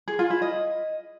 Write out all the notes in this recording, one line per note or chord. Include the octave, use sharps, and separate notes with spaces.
G#4
F4
E4
D#5